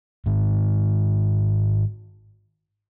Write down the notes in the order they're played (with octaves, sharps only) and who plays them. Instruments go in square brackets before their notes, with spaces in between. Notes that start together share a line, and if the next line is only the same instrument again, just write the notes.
[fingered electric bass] G#2 D#3